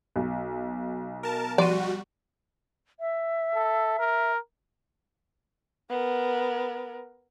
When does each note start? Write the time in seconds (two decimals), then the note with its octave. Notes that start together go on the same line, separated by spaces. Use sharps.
0.16 B1
1.23 A#4 A5
1.58 F3 G3 F#4 D5 C6 D#7
3.00 E5
3.55 A4
3.99 A#4
5.90 B3 A#4